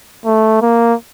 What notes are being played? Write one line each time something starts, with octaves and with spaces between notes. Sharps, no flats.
A3
A#3